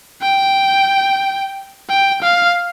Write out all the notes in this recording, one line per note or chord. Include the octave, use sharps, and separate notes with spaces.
G5
G5
F5